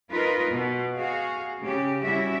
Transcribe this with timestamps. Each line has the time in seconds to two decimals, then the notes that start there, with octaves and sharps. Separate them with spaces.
0.12 D#4 F4 A#4 B4 D#5
0.49 B2
0.95 F#4 G#4 F5
1.61 C#3 G4
2.04 G3 C#4 E4 F#4 E5